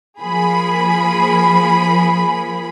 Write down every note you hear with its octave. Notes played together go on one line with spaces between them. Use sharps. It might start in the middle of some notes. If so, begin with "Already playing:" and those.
F3 A#3 G#4 B5